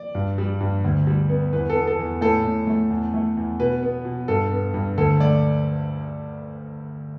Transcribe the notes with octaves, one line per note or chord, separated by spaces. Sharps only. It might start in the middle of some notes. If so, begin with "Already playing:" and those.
Already playing: D5
G2
G3
G2
D2
G3
B3
E2 B4
A4
B3
A4
E2
A2 A4
A2
A3
E2
A3
E2
B2 B4
B3
B2
G2 A4
B3
G2
D2 A4
A3 D5